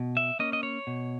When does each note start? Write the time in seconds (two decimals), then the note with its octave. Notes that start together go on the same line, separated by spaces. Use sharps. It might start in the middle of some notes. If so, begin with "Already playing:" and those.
Already playing: B2
0.17 E5
0.39 A#3 C#4 D#5
0.53 D#5
0.63 C#5
0.87 B2